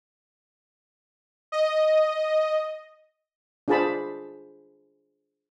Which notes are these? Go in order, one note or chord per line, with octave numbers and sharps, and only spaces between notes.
D#5
D4 F4 G#4 C5 A5 B5